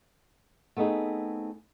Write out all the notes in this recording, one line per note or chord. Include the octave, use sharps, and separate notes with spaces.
A3 B3 C4 D#4 G#4